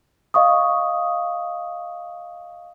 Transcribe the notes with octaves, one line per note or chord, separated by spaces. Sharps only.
D#5 F5 C#6 D#6